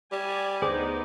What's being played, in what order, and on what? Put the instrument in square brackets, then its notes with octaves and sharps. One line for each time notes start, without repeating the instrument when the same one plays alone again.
[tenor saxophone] G3 [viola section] D5 G#5
[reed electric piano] D2 G#4 [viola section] B3 D#4 [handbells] C5 D6